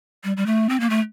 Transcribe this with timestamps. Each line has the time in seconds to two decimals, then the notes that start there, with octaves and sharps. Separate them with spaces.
0.24 G3
0.37 G3
0.46 A3
0.69 C4
0.80 A#3
0.90 A3